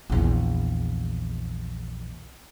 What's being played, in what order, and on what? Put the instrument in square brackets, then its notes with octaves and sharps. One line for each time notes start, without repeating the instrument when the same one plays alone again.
[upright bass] A#1 E2